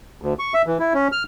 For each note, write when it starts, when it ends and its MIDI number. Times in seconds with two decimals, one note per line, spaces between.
0.22 0.34 38
0.39 0.54 85
0.54 0.62 76
0.67 0.78 52
0.79 0.93 64
0.94 1.08 61
1.12 1.23 89